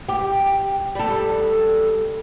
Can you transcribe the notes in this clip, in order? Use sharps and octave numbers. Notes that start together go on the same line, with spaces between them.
G4
G3 A4